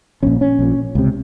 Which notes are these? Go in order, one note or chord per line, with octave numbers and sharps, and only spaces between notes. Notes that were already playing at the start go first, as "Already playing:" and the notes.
A#1 A#2 C#4
C#4
A#1 A#2
C#2 C3